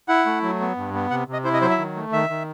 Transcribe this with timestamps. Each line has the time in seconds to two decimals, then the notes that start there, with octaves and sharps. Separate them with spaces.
0.08 E4 F#5
0.26 A3
0.43 F#3
0.60 B3
0.77 G2
0.94 B3
1.10 C3 F#5
1.28 C3
1.33 D#5
1.44 E4 C5
1.54 D#5
1.61 F#3 C5
1.70 E5
1.78 D#3
1.96 A3
2.12 D#3 E5
2.30 D#3